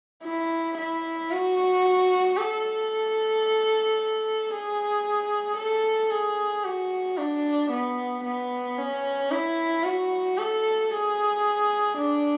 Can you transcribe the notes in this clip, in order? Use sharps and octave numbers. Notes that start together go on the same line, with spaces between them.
E4
E4
F#4
A4
G#4
A4
G#4
F#4
D4
B3
B3
C#4
E4
F#4
A4
G#4
D4